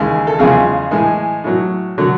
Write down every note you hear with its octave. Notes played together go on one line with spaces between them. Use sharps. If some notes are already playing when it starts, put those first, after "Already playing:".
Already playing: D#2 C#3 E3 G#3
A4
E2 C#3 F3 G#3 G#4
A2 E3 G#3
A2 F#3
D3 F#3